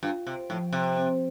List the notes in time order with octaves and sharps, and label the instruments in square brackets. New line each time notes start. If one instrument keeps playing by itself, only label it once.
[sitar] G2 [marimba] F4
[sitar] C3
[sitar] A2 [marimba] F3
[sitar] C3
[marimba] C4